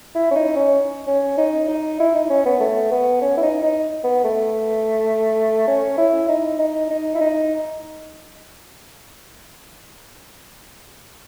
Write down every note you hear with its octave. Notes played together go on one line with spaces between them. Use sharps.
E4
C#4
D#4
C#4
C#4
D#4
D#4
E4
D#4
C#4
B3
A3
B3
C#4
E4
D#4
D#4
B3
A3
C#4
E4
D#4
D#4
D#4
E4
D#4